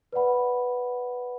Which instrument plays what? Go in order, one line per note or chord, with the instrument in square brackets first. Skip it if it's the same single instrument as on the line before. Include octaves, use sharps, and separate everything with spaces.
[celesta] B4 D5 F#5 B5